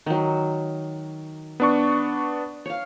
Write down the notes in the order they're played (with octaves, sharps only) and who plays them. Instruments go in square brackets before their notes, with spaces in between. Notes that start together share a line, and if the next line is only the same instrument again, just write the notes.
[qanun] D#3 F#3
[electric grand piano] B3 D4 C#6
[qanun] C#5 F5